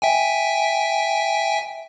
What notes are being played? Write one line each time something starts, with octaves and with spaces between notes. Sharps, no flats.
E5 G5 G#5